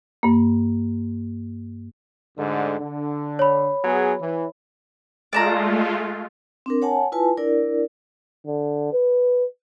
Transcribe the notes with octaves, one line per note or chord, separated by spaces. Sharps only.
G2 A#3
D2 G#2 D3
D3
C#5 B5
F#3 B3 G#4
E3
G#3 A3 F4 D5 A5 A#5
C4 D4 A#4
C#5 F#5 G#5 A5
E4 F4 B4 G#5 A5
D4 E4 A#4 D5
D3
B4